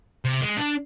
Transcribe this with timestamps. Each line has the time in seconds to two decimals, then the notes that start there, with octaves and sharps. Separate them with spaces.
0.25 C3
0.41 G#3
0.57 D4